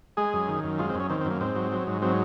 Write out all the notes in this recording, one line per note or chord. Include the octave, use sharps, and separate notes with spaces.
G#3 G#4
F#2
D#3
F#2
G#3 F4
C4
F#2
C#4
D#3 C4
C4
F#2
A#3
G#2 C4
F#3
F#3
G#2
F#3 C4